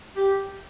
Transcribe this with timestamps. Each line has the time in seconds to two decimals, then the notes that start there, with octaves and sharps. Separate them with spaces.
0.17 G4